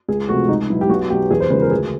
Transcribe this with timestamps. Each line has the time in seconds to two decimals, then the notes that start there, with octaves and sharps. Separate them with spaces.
0.09 C#2 G#4
0.28 C3 F3 A3 F#4
0.48 C#2 D#4
0.70 B2 F#3 E4
0.81 G4
0.89 B1 F#4
1.10 B2 F#3 G4
1.31 E2 G#4
1.40 C5
1.50 C#3 F3 G#3 B4
1.61 A#4
1.71 D2 G#4